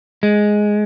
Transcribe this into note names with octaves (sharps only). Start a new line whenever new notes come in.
G#3